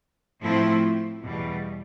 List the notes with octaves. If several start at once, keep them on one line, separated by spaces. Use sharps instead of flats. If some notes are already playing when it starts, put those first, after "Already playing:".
A2 F3 A3 C4 E4
E2 B2 G3